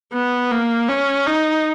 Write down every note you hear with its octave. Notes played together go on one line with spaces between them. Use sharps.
B3
A#3
C#4
D#4